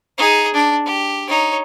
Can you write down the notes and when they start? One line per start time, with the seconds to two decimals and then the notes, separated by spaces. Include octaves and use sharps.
0.18 D#4 G#4
0.54 D4
0.86 G4
1.29 D#4 C#5